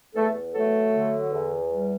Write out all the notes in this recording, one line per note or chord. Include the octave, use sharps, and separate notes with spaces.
E2 A3 A4
F#3 A3 A4
D3
E2
G3